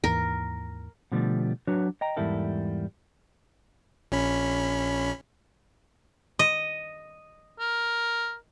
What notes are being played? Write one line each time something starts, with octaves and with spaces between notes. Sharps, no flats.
D#2 G#2 E3 A#4
B2 D3 F3 G3 A3
F#3 D4 F#4 B4 C#5
D#5 G5 A#5
E2 G#2 G3 E4 A4 A#4
A#1 C#4 B5
D#5
A#4